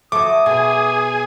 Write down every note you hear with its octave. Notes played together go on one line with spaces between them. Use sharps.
F#3 A3 D6 D#6
B2 G#4